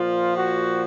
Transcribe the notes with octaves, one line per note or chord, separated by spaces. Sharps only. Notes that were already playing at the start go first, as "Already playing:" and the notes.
Already playing: A#2 F3 F4
F#4